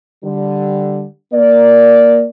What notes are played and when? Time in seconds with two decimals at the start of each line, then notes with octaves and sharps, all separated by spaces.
0.24 D3 G3
1.33 A#3 D5